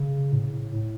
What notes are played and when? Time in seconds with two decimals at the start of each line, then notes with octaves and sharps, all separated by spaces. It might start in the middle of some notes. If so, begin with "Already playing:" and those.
Already playing: C#3
0.32 A2
0.72 A2